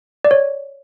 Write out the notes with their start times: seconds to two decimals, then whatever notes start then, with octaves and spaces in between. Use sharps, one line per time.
0.25 D5
0.31 C#5